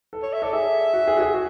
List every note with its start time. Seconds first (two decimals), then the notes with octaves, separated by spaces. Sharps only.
0.13 A4
0.23 C#5
0.33 E5
0.42 A4 D5
0.53 G#4 E5
0.93 F#4
1.08 G#4
1.16 F#4
1.20 G#4
1.34 F#4